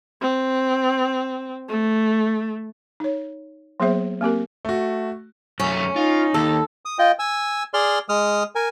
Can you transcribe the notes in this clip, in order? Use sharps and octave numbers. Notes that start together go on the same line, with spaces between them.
C4
A3
D#4 C#5
F#3 A#3 B3 G#4 C5 E5
A#3 C4 G4 A#4
A3 F#4
F#2 A3 C#4
D#4 F4
D#2 A4
D#6
F4 D#5 G5
G#5 E6
G#4 D5 C6 F6
G#3 D#6 F6
A#4 G#5